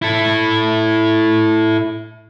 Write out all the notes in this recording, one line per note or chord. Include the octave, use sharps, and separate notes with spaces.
E4 A4